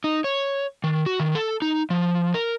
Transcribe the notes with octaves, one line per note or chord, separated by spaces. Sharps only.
D#4
C#5
D#3
F#4
D#3
A4
D#4
F3
A#4